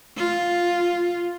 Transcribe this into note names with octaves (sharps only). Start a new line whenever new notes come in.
F4